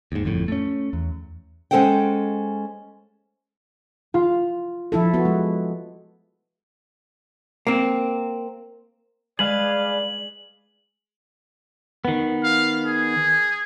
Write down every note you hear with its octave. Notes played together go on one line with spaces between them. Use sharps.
D#2 G#2
G1 F2 A2
A3 C#4
E2
G#3 C#4 A4 C5 F#5 G5
F4
F3 E4 A4
B3 F#4
G#3
A#3 C4
G#3 G#4 B4 D5 F5 D#6 F#7
D#3 B3
F5
G#4